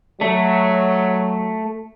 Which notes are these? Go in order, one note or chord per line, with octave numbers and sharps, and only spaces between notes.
F#3 A3